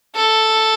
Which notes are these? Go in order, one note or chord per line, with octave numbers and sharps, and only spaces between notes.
A4